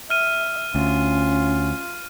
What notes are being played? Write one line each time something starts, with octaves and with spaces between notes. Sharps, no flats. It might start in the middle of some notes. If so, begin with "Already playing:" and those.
E5 F6 D#7
D2 C#4 F4